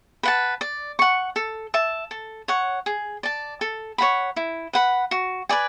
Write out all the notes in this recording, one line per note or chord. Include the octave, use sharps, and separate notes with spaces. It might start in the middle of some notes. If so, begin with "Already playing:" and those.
B4 F#5 A5
D5
F#5 C#6
A4
E5 A5
A4
C#5 F#5
G#4
D5 A5
A4
C#5 F#5 B5
E4
B4 F#5 B5
F#4
B4 D5 G#5